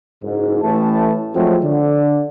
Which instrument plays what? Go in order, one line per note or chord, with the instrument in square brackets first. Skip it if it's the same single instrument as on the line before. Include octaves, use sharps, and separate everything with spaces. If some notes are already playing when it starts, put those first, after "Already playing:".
[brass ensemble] F#1 G#2
A1 A2 E3 A3 A5
F3 F#3 G#3 A3 C4
D3